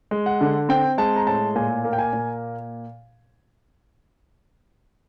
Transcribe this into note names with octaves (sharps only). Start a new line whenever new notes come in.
G#3
F#5
D3
C4 G5
G#3 A5
A#5
A2 A5
A#2 G#5
A#3
G5
G#5
A#2